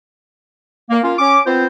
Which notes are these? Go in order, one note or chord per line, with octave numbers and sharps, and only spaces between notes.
A#3
A#3 C#4 F4
C#4 D6
B3 C4 F4 C5